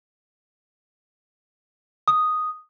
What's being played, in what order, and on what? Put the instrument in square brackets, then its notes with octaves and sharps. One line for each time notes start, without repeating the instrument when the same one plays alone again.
[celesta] D#6